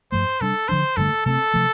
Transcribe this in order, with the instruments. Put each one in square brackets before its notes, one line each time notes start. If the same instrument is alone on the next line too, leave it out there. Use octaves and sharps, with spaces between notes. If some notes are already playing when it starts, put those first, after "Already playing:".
[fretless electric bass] G2 F3 A3 [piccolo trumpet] C5
[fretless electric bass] C3 G3 D4 [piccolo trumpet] A4
[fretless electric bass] D3 F3 D4 [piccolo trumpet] C5
[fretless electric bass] G2 D3 A3 [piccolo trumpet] A4
[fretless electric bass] C3 A3 C4 [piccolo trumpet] A4
[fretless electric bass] C3 F3 A3